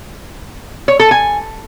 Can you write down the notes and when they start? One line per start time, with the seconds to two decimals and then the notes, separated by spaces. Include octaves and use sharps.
0.88 C#5
1.00 A4
1.11 G#5